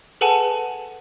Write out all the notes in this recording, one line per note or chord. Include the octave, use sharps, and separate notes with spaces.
G#4 A4 B4 F#5 G#5 A5